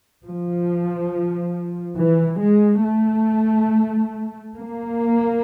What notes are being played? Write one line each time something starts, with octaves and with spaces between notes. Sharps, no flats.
F3
E3
G#3
A3
A#3